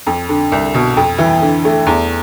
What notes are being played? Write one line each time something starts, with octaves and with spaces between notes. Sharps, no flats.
F2
D3
C2
B2
F2
E3
D3
A3
E2